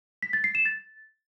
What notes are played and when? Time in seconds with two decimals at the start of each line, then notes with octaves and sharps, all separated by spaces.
0.23 B6
0.33 A6
0.44 C7
0.55 E7
0.65 A6